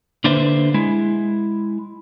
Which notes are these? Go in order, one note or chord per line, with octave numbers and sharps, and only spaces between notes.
D3 A#3 D4 B4 C5 E5
G#3 E4